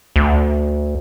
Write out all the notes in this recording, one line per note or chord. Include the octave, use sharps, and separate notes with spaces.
D2